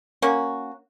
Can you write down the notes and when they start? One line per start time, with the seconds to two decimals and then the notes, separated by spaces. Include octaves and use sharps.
0.22 A#3 C#4 F#4